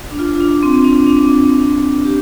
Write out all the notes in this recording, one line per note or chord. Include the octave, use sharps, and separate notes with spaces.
D4
F4
F4
D4
C4
C4
D4
D4
C4
D4
G4